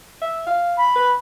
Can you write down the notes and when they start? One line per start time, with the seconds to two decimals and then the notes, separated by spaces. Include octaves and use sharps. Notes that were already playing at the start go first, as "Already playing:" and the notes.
0.22 E5
0.47 F5
0.77 B5
0.96 B4